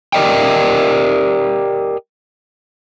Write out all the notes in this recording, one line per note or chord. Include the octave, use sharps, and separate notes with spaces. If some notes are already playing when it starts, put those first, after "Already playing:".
G4 A#4 D5 D#5 G5